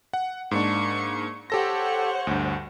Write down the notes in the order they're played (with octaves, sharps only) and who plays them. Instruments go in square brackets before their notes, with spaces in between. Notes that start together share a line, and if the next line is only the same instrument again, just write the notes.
[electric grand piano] F#5
[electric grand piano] G#2 A#3 D4 [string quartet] C#6
[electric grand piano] G4 A4 A#6 [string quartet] C5 C#5 F#5
[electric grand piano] D2 G2